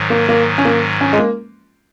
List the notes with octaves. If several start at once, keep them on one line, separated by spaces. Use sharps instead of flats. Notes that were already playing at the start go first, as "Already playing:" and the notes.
Already playing: G#2 D#3 F#3
A#3
A#3
C#4
A#3
C#4
G#3
A#3